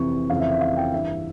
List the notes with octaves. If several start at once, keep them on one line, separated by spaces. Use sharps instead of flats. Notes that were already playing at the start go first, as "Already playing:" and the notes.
Already playing: F2 C3 E3 C#6
F2 C#3 E3 F5
E5
E5
F5
G5
G2 E3 E5